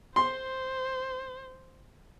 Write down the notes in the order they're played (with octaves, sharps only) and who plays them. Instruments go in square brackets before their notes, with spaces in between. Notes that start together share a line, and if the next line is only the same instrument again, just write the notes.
[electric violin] C5 [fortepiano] C6